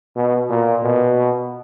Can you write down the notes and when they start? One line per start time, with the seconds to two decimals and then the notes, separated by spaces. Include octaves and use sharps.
0.16 B2
0.49 A#2
0.83 B2